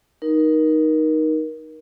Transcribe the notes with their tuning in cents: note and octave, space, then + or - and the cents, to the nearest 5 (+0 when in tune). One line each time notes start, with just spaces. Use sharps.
D#4 +0 A#4 +25